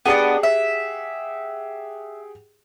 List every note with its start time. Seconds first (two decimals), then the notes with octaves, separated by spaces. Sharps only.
0.06 B3 D4 G4 G#4 D#5 F#5
0.43 E5